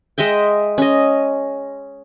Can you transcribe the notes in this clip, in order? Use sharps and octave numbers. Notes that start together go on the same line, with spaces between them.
G#3 D#5 E5 G5
C#4 D#5